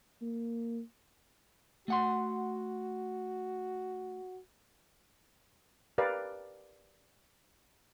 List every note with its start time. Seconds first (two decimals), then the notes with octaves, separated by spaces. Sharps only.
0.22 A#3
1.88 A3 F#4 F#5 C6
5.98 G4 A#4 B4 D5 F5